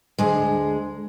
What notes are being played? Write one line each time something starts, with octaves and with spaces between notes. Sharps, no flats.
D2 G#3